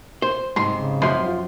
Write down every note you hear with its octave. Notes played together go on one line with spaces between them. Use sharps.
C5
G#2 C3 C6
C#3
F#2 F3 C6
F4